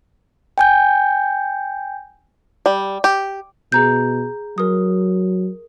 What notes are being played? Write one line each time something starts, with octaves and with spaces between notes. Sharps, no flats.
G5 G#5 G6
G3
G4
B2 G#4 A#5 G6
F#3 A#4 D#6